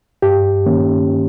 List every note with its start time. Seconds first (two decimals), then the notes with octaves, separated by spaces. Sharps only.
0.22 G2 G4
0.66 D#3 A#3 C#4